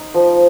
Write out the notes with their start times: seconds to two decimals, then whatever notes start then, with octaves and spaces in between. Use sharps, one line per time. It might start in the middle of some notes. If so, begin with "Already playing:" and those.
Already playing: D#4
0.14 F3